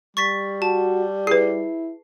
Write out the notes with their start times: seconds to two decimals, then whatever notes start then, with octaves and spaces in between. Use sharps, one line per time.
0.17 G3 C#6 A6 B6
0.62 F#4 A5
1.27 E4 G#4 B4 C7